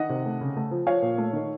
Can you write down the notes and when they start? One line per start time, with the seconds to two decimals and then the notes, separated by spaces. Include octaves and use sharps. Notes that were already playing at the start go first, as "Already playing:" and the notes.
Already playing: D#3 D#5 F#5
0.09 C3
0.26 A3
0.41 C#3
0.57 A3
0.71 F3
0.87 F3 C#5 F5
1.02 A#2
1.18 A3
1.33 D#3